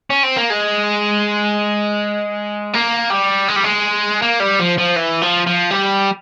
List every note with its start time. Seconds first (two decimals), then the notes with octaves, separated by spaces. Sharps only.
0.10 C#4
0.23 C4
0.37 A#3
0.50 G#3
2.73 A#3
3.10 G3
3.48 G#3
3.56 G3
3.64 G#3
4.22 A#3
4.40 G3
4.59 F3
4.78 F3
4.96 E3
5.22 F3
5.46 F3
5.70 G3